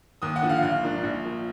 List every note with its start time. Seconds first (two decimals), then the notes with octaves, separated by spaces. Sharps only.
0.22 D#2 D#6
0.36 F#5
0.42 D3 F3
0.50 F5
0.62 A#1 F5
0.83 G#2 F3 A#3 D4
1.03 A#1
1.24 A#2 F3